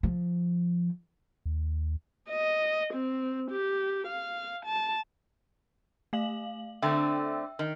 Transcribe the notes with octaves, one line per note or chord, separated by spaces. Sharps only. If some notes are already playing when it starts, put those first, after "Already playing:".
F3
D#2
D#5
C4
G4
F5
A5
A3 F5 F#7
D3 A3 C4 E5 G5 E6
D#3